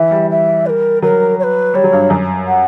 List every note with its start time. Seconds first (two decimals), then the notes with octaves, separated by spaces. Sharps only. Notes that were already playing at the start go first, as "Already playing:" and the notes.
Already playing: E3 E5
0.11 G3
0.30 E5
0.65 B4
0.69 A#4
1.02 F#3 A#4
1.39 C#5
1.43 B4
1.74 G3 C#5
1.84 F#3
1.93 G2
2.10 F#2
2.47 F#5